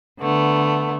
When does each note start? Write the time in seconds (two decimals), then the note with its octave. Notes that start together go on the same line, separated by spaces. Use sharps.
0.20 D3 A3 B3